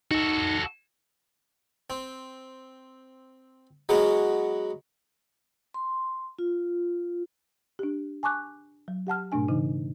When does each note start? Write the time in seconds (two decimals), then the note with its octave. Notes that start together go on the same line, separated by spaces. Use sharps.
0.11 D#4 F#4 A4
1.90 C4
3.89 F#3 G#3 B3 C#4 G#4
5.74 C6
6.39 F4
7.79 D4 G4
8.23 G#5 A5 C#6 D6 F#6
8.88 F#3
9.07 G4 F#5 A5 F6
9.32 G#2 B2 A3 D4 G#5
9.48 C#3 E3 D#4